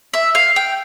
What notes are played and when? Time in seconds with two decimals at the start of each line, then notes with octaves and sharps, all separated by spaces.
0.14 E5
0.35 F5
0.56 G5